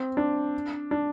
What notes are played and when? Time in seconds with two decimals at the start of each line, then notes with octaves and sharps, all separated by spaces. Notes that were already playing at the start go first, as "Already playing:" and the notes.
Already playing: C4
0.17 D4
0.91 D4